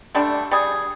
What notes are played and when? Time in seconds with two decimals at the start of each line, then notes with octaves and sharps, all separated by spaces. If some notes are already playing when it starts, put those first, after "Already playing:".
0.15 D3 G3 A3 D4
0.51 G3 G#4